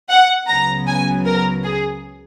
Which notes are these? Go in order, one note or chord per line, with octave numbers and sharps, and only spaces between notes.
F#5
C#2 C#3 F#3 B3 A#5
G#5
A#4
G#4